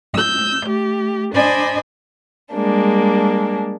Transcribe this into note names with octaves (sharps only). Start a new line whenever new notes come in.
E6 G6
A3 G4
D4 C5 D5 D#5 G#5 B5
G3 G#3 A#3 D4